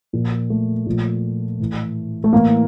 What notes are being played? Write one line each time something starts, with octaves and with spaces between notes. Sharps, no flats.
A#2 F3
A3
A#2 F3
A2 E3
A3
A2 E3 A#3